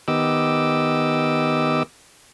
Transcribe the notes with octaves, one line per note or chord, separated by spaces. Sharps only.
D#3 B3 G4 D#5 D6 E6